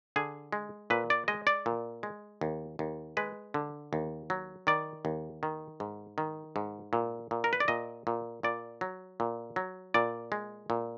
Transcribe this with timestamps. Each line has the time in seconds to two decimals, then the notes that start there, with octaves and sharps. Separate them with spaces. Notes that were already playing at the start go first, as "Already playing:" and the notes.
0.16 D3 G#4
0.53 G#3
0.90 A#2 B4
1.10 D5
1.28 G#3 D#5
1.47 D5
1.66 A#2
2.03 G#3
2.41 D#2
2.79 D#2
3.17 G#3 B4
3.54 D3
3.93 D#2
4.30 F#3
4.67 D#3 D5
5.05 D#2
5.43 D#3
5.80 G#2
6.18 D#3
6.56 G#2
6.93 A#2
7.31 A#2
7.44 A#4
7.53 B4
7.60 D5
7.68 A#2 D#5
8.07 A#2
8.43 A#2 D5
8.81 F#3
9.20 A#2
9.56 F#3
9.94 A#2 D5
10.32 G#3
10.70 A#2